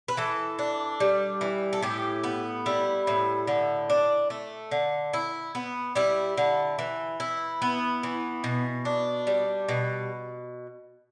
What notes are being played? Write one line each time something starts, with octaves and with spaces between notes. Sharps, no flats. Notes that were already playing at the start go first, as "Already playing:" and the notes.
B4
E3 A4
D4
G3
E3
A4
A2 G4
B3
G3 E4
A2
D3
D4
A3
D3
E4
B3
G3 E4
D3
E3
E4
B3
E3
B2
D4
G3
B2